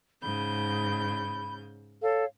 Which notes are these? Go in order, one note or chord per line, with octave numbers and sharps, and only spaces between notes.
G#2 C#3 B5 G6
A4 C#5 F5